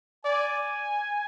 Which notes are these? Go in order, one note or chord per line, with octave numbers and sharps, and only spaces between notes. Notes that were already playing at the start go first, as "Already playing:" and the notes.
D5 G#5